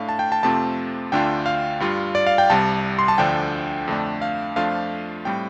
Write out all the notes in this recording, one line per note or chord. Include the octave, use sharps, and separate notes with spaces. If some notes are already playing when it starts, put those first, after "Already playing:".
Already playing: A2 A3 D4 F5
A5
G5
A5
F2 C3 A3 C4 F4 A5
D2 D3 A3 D4 F4 G5
F5
G2 G3 F4
D5
F5
G5
C2 C3 G3 A5
C6
A5
D2 D3 F3 D4 G5
F2 D3 A3 D4
F5
F2 F3 A3 D4 F4 F5
A2 G3 C4 G5